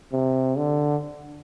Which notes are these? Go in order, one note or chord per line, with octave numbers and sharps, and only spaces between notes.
C3
D3